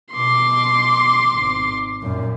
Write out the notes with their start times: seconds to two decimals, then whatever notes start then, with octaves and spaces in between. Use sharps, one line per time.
0.14 B2 C6 D6
1.32 G#1
2.02 F#2 A#2